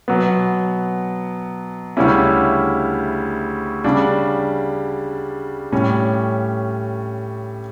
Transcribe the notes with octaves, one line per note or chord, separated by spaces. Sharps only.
B2 F#3 B3
D2 C#3 G3 C#4 E4
C#3 G3 D4
A2 G3 C#4